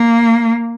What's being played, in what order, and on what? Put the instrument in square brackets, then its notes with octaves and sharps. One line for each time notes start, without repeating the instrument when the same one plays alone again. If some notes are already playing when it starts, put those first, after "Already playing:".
Already playing: [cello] A#3